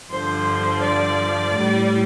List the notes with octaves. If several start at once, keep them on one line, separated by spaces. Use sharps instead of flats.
G2 D3 F3 C5
D5
A2 G3